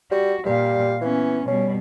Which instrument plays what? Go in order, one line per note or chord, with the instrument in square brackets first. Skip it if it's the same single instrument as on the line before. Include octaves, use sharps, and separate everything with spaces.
[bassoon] G3 [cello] F#4
[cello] A#2 F5 [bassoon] G3
[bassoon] E3 [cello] B3 C#4
[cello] B2 G3 [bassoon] C#4